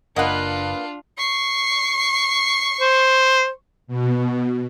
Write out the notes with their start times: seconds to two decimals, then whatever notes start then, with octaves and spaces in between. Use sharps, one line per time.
0.16 F#1 A#3 D4 F4 B4 D#5 F#5
1.18 C#6 C7
2.81 C5
3.87 B2